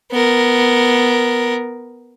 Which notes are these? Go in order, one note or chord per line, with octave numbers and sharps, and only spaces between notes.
B3 A#4